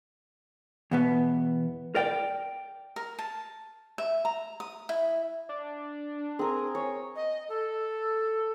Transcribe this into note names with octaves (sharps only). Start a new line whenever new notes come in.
E2 B2 B3
A#4 D5 G5
A#4
A5
E5
A#5
D#6
E4
D4
C4 G#4 A#4
C#5
D#5
A4